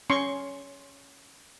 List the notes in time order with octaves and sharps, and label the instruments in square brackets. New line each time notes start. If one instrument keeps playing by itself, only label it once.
[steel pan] C#4 C6 C#6